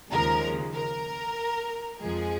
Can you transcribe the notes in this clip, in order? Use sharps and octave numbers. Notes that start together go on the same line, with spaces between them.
D#2 C#3 F3 G#3 A#4
A#4
F2 F3 G#3 G#4